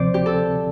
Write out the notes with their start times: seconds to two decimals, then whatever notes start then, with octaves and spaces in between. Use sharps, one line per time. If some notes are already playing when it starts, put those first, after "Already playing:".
Already playing: D2 C3 F3 C4 C5 D5
0.14 G4
0.26 A4